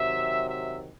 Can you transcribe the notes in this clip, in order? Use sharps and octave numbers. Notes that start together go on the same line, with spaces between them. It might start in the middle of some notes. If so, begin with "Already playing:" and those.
Already playing: C3 D#3 F#3 E5
E5